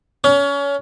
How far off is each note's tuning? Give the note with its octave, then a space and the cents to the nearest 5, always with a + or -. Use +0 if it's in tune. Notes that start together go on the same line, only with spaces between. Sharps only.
C#4 +25